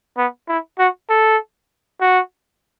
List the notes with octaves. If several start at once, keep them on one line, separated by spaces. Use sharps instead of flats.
B3
E4
F#4
A4
F#4